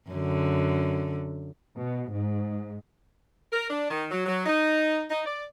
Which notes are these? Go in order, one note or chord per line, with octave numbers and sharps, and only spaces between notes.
F#2 D3
B2
G#2
A#4
D4
D#3
F#3
F#3
D#4
D#4
D5